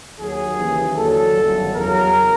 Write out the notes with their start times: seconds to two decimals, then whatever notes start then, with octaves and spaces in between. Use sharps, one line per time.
0.20 D#2 D#3 F#3 G#4
0.58 D#2 C#3 E3
0.96 D#2 D3 F#3 A4
1.35 G1 F#2 C#3 F#3
1.74 E2 C#3 F#3 A#4